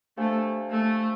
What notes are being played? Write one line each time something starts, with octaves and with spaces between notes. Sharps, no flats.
A3 D4 G4 C5 F5 G#5
A3